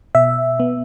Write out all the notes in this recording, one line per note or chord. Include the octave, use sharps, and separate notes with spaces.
B2 E5
B3